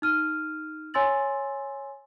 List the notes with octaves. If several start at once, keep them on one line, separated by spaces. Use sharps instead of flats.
D#4 F6 D#7
C#5 G#5 C6 E6 A6 F#7